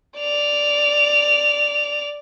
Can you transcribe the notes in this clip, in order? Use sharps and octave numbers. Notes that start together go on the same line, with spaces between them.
D5 F7